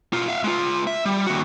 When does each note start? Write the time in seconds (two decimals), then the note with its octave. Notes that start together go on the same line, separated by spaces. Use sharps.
0.13 B2 F4
0.28 E5 F5
0.44 G#3 F4
0.87 E5
1.05 G3
1.27 D#2 F#4